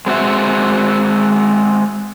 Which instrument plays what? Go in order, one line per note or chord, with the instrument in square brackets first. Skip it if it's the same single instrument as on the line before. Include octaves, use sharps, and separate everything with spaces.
[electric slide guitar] G#3 C4 F#4 E5